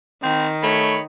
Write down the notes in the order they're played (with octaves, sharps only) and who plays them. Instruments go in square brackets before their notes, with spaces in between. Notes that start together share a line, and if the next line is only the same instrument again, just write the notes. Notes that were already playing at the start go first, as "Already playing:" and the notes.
[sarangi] D#3 [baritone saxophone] C4
[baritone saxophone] A3 [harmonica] C#5 B5